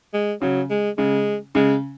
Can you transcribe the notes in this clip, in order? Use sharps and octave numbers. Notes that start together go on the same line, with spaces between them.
G#3
C#3 F#3
G#3
C#3 G#3
C#3 G#3